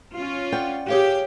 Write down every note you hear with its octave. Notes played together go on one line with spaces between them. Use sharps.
C#4 F4
D5 F#5 G5
G4 G#4 C#5 F5